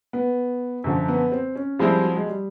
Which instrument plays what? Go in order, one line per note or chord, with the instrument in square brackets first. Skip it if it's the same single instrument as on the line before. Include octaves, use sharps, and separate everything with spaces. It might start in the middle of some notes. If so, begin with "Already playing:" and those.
[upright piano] B3
[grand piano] F#2 D3 F3
[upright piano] B3
C4
C#4
[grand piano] F3 G#3 C4 E4 [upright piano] G3
[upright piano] F#3
G#3
G3